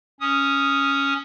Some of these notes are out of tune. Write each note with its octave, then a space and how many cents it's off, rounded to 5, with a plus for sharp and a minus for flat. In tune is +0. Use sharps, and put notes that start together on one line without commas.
C#4 +0 D#6 +0